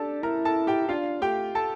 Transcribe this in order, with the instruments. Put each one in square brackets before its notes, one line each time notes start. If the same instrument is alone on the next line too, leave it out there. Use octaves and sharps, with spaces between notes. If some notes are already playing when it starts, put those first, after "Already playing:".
Already playing: [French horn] D4 [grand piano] G4 A4 A5
[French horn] E4 [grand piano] A#4 A#5
[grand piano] A4 A5
G4 G5
[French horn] D4 [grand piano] F4 F5
[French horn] A3 [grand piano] G4 G5
[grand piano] A4 A5